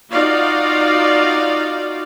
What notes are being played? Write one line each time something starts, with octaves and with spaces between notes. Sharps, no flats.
D#4 F4 F#4 D5 F5